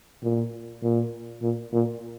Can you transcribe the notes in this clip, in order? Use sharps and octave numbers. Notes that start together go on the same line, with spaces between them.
A#2
A#2
A#2
A#2